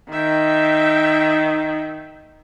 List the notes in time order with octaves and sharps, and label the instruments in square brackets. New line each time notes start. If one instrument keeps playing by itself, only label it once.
[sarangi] D#3 [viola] E5 G5